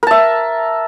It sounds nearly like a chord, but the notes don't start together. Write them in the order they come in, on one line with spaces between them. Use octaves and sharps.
A#4 A5 E5